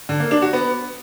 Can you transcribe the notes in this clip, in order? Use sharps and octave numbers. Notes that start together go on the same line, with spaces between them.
D3
A#3
D4
F#4
B3